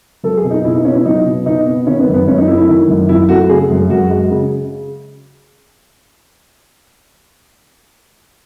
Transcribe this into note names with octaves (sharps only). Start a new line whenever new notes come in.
F#3 A4
G#4
B2
D#4
B2 E4
D#4
B3 C#4
E4
F#3 D#4
B2
B2 D#4
B3
D#3 C#4
B3
F#2
B3
F#2 C#4
D#4
A3 E4
E4
D#3
F#2
F#2 E4
A3 F#4
C#3 G#4
F#2
F#2 F#4
G#3
C#3